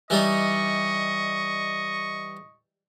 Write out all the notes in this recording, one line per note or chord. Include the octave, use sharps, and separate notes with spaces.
E3 G3 D#4 D#5 C#6